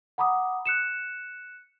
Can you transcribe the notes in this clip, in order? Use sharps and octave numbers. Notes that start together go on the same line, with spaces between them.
F#5 A#5 B5 D6 D#6
F#6 C#7 E7